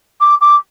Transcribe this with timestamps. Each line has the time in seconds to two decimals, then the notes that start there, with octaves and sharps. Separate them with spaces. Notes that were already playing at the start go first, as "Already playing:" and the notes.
0.21 D6
0.41 D6